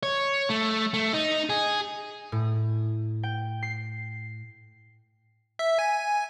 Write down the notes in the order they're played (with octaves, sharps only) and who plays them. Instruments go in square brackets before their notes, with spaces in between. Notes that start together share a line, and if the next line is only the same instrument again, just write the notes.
[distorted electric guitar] C#5
A3
A3
D#4
G#4
[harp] A2
G5
C7
[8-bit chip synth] E5
G#5